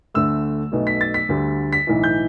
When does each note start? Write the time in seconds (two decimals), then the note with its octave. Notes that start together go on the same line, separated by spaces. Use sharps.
0.14 D2 D3 A3 E6
0.72 B1 B2 A3
0.87 B6
1.01 A6
1.14 B6
1.29 D2 D3 G3
1.73 B6
1.87 B1 A2 E3
2.04 G6